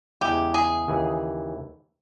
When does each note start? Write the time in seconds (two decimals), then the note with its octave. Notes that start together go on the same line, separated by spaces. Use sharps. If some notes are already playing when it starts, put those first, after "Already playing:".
0.21 E2 C#3 E3 G#3 G4
0.54 G#4
0.88 D#2 C#3 E3